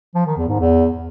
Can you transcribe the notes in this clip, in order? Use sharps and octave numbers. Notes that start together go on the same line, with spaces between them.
F3
D#3
E2
G#2
E2